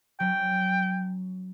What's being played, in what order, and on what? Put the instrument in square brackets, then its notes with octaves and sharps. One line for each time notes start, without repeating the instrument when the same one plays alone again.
[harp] F#3 C#4 [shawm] G5